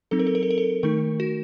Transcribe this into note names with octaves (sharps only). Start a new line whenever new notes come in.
F#3 C4 D#4 A4
A#4
A4
A#4
A4
A#4
A4
D#3 A3 D#4 A#4
F#4